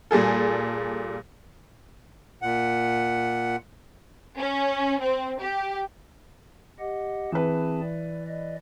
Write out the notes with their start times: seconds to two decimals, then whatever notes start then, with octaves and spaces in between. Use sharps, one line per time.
0.11 A#2 G3 G#4 A4
2.42 A#2 F#5
4.38 C#4
5.00 C4
5.40 G4
6.79 G4 D#5 F#5
7.32 E3 C4 G#4 B4 A5
7.81 D5
8.27 D5 D#5